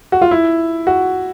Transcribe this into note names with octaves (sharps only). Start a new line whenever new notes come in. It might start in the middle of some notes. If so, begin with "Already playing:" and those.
F#4
F4
E4
F#4